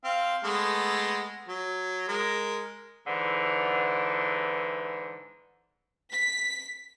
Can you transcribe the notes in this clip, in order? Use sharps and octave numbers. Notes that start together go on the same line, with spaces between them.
C4 F5
G#3 A3 B3
F#3
G#3 A#4
G#2 D3 E3
B6